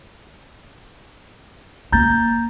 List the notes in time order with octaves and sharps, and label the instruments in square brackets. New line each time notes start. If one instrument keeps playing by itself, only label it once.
[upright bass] A#3 C#4 [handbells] A#5 G6 A6